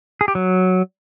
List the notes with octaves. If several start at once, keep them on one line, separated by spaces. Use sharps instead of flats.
G#4
G4
F#3